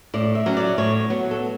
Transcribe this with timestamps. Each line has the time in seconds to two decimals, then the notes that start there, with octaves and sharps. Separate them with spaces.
0.14 A2 D5
0.35 E5
0.46 F#3 C#4
0.57 D5
0.78 A2 C#5
1.10 F#3 B3
1.31 A4